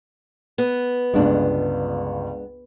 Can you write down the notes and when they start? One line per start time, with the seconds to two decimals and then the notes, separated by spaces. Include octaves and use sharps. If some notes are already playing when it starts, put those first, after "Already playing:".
0.58 B3
1.14 G1 C#2 G#3 D4